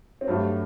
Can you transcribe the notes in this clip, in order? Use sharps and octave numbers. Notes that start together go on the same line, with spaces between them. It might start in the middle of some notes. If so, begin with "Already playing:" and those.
C4
G2 F#3 A3 D4